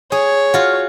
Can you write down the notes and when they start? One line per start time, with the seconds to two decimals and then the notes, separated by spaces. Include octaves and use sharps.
0.12 G#4 C#5
0.54 F4 F#4